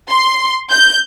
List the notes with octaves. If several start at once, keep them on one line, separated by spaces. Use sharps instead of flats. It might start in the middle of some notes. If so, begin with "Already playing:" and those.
C6
G6